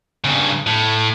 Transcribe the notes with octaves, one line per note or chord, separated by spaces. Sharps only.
G2 C#3
A2